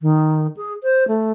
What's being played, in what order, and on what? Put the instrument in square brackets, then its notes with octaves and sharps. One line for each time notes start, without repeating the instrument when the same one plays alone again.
[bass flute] D#3
G#4
C5
A3